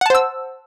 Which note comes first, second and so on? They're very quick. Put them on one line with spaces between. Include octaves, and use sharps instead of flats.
F#5 A5 C5 E6